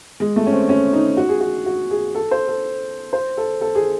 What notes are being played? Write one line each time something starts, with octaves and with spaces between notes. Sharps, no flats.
G#3
A3
C#4
C4
C#4
D#4
F#4
G#4
F#4
F#4
G#4
A4
C5
A4
C5
A4
A4
G#4